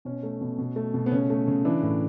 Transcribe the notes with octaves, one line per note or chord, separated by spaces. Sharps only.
B2 C#4
A3
B2
B2
A3
B2
B3
C#3 C#4
A3
C#3
E3 D4
A2